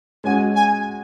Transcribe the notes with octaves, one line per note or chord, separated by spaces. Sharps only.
G#3 C#4 F#4 G#5
G#5